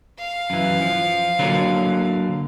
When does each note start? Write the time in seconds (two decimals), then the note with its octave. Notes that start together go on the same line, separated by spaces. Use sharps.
0.19 F5
0.50 F#2 E3
0.82 F3
1.39 D3 F#3 A#3